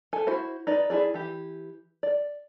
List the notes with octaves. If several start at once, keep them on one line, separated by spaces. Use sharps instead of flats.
A4 G#5
E4 F#4 C5
D#4 B4 D5
E4 F4 G#4 D5
E3 G4
D5